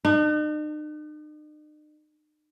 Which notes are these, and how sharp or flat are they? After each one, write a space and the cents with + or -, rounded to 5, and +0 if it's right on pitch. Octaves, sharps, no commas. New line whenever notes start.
D#4 -45